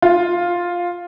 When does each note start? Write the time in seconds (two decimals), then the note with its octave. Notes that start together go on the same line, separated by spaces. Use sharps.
0.02 F4